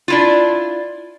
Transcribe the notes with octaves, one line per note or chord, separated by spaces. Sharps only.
D4 E4 F4